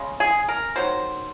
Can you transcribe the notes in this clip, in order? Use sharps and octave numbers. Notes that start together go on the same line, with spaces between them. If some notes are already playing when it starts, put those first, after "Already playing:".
Already playing: C#3 G#3
G#4
A#4
D#3 F#3 C5